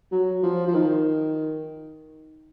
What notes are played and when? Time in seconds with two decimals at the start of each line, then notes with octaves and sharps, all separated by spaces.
0.12 F#3
0.43 F3
0.68 F3
0.74 D#3